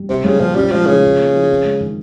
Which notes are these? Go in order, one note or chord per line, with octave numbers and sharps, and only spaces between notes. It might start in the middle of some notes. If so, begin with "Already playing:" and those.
Already playing: G3
C3 C4
C#3 G3
A#2 F3
G3 C#4
F3 G#3
C#3 F3
F4
A#3
F3
C4
G#3
D#3